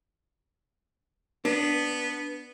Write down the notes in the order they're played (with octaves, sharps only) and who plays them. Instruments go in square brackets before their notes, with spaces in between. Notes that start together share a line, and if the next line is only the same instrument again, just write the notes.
[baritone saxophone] B3 [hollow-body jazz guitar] D4